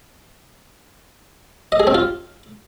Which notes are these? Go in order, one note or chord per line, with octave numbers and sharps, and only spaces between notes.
D#5
G#4
C4
F4